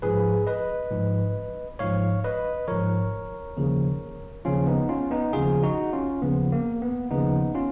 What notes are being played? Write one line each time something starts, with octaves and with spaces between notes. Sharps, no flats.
G#2 F3 G#4 B4
B4 D#5
G#2 F3
G#2 F3 C#5 F5
B4 D#5
G#2 F3 A#4 C#5
D#2 C#3 F3
D#2 C#3 F3 C#4 F4
B3 D#4
C#4 F4
B3 D#4
D#2 C#3 F3 F4 G#4
D#4 F#4
C#4 F4
D#2 C#3 F3 B3
A#3
B3
D#2 C#3 F3 B3 D#4
C#4 F4